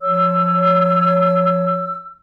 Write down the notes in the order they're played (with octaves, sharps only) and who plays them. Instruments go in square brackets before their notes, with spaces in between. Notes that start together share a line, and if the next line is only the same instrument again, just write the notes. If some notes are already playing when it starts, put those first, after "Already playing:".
[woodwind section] F3 C#5 E6